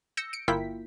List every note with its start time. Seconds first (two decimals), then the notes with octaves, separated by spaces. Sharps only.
0.17 E6 G6 A#6 C#7
0.33 C#7 D7
0.48 G1 A#3 E4 F4 G5 B6